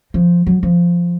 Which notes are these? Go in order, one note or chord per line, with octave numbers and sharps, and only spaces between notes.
F3
F#3
F3